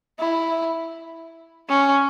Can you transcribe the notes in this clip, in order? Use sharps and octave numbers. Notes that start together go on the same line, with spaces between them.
E4
C#4